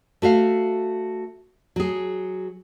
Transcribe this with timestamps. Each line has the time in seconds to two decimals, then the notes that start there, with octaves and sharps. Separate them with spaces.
0.22 A3 F#4 E5 F5
1.76 F#3 G#4